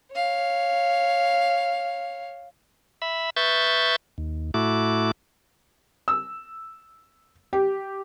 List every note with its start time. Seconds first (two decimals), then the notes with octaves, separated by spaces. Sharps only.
0.13 C#5 F5
3.02 E5 B5
3.36 B4 E5 C#6 G6 A6
4.18 D#2
4.54 A2 A3 E4 F#4 D6
6.08 E6
7.53 G4